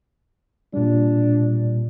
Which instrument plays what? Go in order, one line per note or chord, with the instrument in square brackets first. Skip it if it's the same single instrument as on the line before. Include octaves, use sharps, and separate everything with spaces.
[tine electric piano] A#2 G3 [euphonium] D4